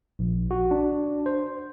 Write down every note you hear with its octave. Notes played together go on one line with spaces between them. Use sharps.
A#1
F#4
D4
C5